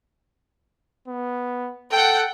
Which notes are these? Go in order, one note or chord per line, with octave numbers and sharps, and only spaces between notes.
B3
A4 F#5 G5